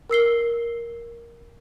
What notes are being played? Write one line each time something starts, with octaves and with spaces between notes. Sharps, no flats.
A#4 E6 C7 G7